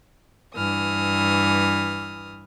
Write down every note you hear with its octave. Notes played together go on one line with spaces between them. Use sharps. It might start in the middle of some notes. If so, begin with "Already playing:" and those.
G2 E3 D#6 F6